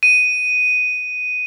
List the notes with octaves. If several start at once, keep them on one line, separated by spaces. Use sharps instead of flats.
D#7